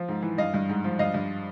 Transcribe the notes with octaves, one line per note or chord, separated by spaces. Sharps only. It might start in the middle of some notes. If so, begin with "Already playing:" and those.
Already playing: F3
G#2
E3
G2 D#5 F5
G2
G#2
F3
G2 D#5 F5
G2